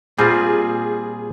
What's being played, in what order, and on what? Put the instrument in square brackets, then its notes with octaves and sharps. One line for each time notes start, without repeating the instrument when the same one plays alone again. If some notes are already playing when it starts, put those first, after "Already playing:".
[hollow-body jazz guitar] A#2 [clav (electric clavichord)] G3 C4 F4 [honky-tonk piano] G#4